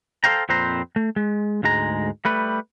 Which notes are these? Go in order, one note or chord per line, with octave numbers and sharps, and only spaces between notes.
A4 A#4 C5 F5 G5 A#5
F2 A#2 C4 B4 C5 A#5
A3
G#3
D2 G#2 G#3 A#5
G3 A3 B4